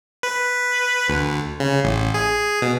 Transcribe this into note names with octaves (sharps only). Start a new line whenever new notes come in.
B4
D2
C#3
A1
G#4
B2